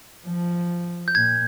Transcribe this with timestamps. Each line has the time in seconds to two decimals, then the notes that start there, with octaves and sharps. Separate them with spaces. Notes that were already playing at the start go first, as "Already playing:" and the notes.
0.25 F3
1.08 G6
1.15 A#2 G#6